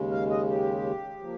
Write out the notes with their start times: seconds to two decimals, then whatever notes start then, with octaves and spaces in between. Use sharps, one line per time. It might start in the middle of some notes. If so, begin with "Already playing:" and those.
Already playing: D#2 C#3 G#3
0.11 F5
0.30 D#5
0.48 G4
1.21 F3 A#3